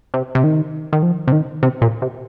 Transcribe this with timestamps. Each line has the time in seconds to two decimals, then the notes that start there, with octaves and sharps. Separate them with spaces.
0.14 C3
0.35 C3
0.44 D#3
0.93 D#3
1.03 F3
1.28 C3
1.32 D#3
1.63 C3
1.82 A#2
2.02 C3